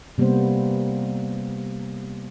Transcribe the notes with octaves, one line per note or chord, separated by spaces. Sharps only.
C3 G3 A#3 B3 C5